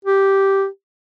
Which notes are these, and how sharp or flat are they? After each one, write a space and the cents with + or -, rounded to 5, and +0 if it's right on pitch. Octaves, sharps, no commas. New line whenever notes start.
G4 -5